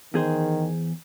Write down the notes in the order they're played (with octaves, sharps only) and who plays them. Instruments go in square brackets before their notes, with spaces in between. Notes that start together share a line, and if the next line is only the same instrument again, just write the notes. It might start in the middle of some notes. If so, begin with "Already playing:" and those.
[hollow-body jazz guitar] E2 G#4 C5 [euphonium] D#3